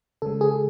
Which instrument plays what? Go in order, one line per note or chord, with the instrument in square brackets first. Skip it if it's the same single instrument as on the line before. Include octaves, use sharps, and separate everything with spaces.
[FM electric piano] C#3 G#3 A4
G#4